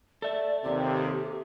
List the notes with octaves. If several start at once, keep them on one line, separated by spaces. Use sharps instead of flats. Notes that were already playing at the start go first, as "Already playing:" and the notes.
A4 D5 E5
D#2 C3 G4